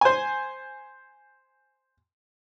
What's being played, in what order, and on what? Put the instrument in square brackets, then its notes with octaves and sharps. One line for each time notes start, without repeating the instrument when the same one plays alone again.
[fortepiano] C5 G#5